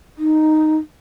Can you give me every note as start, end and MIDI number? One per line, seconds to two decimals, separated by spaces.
0.18 0.76 63